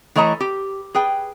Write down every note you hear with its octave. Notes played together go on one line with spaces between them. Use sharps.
E3 A3 C#5 D#5 A#5
G4
G#4 B4 G5